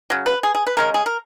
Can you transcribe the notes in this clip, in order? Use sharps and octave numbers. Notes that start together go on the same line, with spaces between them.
C#3 F#3
B4
G#4
G#4
B4
C#3 G#3 C#4 A#4
G#4
A#4